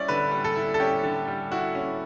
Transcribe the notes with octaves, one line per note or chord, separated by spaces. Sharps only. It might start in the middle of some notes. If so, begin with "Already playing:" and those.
Already playing: G3 C#4 E4 D5
D3 B4
G3
A4
E4
A4
C#4 G4
D3
G3
E4 F#4
C#4